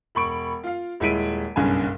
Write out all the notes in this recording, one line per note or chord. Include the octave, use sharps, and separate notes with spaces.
E1 B5 C#6 D7
F4 F5
D#1 G#3 E4 B6 D7 D#7
F#1 B1 G2 C#3 G#5